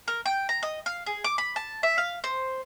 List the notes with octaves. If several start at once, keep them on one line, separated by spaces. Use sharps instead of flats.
A#4
G5
A#5
D#5
F5
G#4
D6
B5
A5
E5
F5
C5